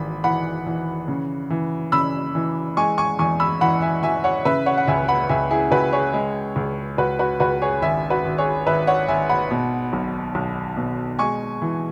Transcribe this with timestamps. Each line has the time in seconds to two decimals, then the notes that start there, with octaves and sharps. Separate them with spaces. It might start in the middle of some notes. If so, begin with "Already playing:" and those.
Already playing: G#1 E3 B5
0.24 E3 F#5 B5
0.66 E3
1.08 C#3
1.50 E3
1.92 C#3 B5 E6
2.35 E3
2.77 G#3 G#5 C#6
2.98 G#5 C#6
3.19 E2 G#5 C#6
3.40 B5 E6
3.61 E3 F#5 B5
3.82 E5 G#5
4.03 E3 E5 G#5
4.24 C#5 F#5
4.45 C#3 B4 E5
4.66 C#5 F#5
4.77 F#5
4.88 C#2 E5 G#5
5.08 F#5 B5
5.29 C#2 E5 G#5
5.51 E4 G#4
5.71 C#2 F#4 B4
5.93 G#4 C#5
6.14 G#3
6.56 C#2
6.98 C#2 F#4 B4
7.19 F#4 B4
7.40 C#2 F#4 B4
7.62 G#4 C#5
7.82 G#1 E5 G#5
8.10 F#4 B4
8.25 G#1
8.38 G#4 C#5
8.66 G#1 B4 E5
8.87 C#5 F#5
9.08 G#1 E5 G#5
9.29 F#5 B5
9.51 B2
9.93 B1
10.35 B1
10.77 B2
11.19 G#3 G#5 C#6
11.62 E3